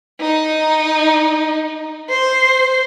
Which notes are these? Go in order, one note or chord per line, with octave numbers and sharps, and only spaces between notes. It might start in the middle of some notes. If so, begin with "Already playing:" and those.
D#4
C5